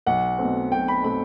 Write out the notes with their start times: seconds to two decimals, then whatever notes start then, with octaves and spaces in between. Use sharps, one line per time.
0.06 B1 F#5
0.39 B2 A3 C4
0.71 B1 G5
0.88 B5
1.04 B2 A3 C4 B5